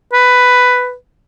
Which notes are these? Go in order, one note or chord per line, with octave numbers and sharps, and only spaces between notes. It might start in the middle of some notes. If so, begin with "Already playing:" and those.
B4